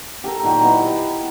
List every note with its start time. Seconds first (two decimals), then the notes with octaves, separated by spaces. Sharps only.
0.24 G4 A4 A#4
0.43 A#2 D#3 F#3 G4
0.61 B3 E4
0.93 B5